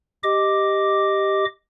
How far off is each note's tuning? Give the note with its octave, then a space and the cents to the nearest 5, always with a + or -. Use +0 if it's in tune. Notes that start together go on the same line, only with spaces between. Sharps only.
G4 +0 D#5 +0 D6 +0